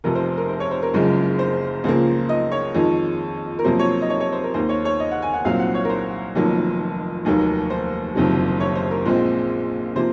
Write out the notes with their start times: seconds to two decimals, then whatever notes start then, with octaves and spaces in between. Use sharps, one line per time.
0.04 F1 F2 C3 A#4
0.15 C5
0.38 A#4
0.49 C5
0.60 C#5
0.71 C5
0.82 A#4
0.94 F#1 F#2 C#3 F3 G#3
1.39 C5
1.84 C#2 C#3 F3 A#3 C5
2.29 D#5
2.51 C#5
2.75 F2 D#3 G#3
3.59 A#4
3.64 F2 C3 F#3 A#3 C5
3.79 C#5
4.02 D#5
4.10 C#5
4.20 C#5
4.32 C5
4.44 A#4
4.54 D#2 D#3 A#3 C5
4.69 C#5
4.85 C#5
5.00 D#5
5.11 F#5
5.22 G#5
5.33 F#5
5.45 C2 A#2 F#3 C4 F5
5.60 F#5
5.74 C#5
5.85 A#4
5.90 C5
6.35 F1 F2 D#3 F#3 A#3
7.25 F1 D#2 D#3 F#3 A#3
7.70 C5
8.15 F#1 F2 C3 D#3 F#3
8.60 C#5
8.75 C5
8.91 A#4
9.05 A#1 A#2 G#3 C4 C5
9.96 C3 F3 A#3 C5